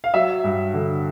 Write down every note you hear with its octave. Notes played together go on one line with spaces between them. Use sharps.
F5
F#3 E5
G2
D3